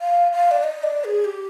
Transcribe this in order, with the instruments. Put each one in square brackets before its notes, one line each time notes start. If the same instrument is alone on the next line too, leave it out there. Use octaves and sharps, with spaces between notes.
[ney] F5
F5
D5
D#5
D5
G#4
G4